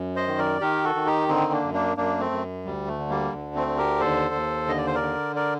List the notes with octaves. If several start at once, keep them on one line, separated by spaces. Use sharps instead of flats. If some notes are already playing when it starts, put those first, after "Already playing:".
Already playing: F#2
C5 D#5
D#3
A#4 D5
D#3 G4 A#4
F#4 A4
D#3
D#4 G4
D3 C4 D#4
A#3 D4
F#2
A#3 D4
F#2 A#3 D4
A3 C4
F#2
D2 G3
A3
D3
G3 A#3
D2
A3 C4
D3
G4 A#4
D#2 A4 C5
D#2
D3 D#5
D5
C5
A#4 D5
D3
A#4 D5